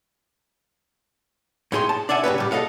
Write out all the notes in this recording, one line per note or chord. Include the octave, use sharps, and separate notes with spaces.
A2 A3 E4 G#4 G5 C6
A5
D4 D5 E5 F#5 G#5
G2 C#3 C#4 B4
A2 G3
G#4 A4 B4 D#5 F5 F#5